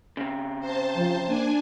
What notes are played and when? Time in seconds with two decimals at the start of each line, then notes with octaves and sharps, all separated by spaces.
0.17 C#3 C4
0.60 C5 A5
0.95 F3
1.27 A#3 D4 G#5